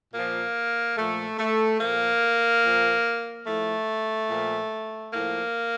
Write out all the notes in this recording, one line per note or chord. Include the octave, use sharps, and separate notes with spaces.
A#2 F3 A#3
A#2 F3 A3
A3
A#2 F3 A#3
A#2 F3
A2 F3 A3
A#2 F3
A2 F3 A#3